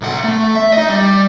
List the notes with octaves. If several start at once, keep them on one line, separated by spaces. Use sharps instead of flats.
B1 F#5
A3
E5
D#4 D#5
G3